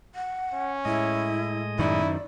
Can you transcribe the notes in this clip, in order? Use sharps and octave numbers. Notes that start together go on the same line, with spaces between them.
F#5
C#4
A2 G#3 E4 D#5
F#2 D#3 E4 D5